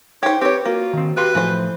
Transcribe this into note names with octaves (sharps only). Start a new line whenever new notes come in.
D#4 G4 C5 C#5
C4 G4 B4 C#5
A#3 F4 F#4
D#3 C4
G4 B4 F5 C6
A2 E3 F3 C5